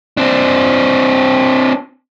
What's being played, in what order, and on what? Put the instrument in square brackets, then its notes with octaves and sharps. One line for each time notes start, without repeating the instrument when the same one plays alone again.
[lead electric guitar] C4 D4